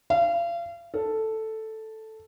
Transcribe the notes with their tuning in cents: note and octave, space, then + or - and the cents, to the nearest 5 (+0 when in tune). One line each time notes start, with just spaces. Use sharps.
F5 -35
A4 +0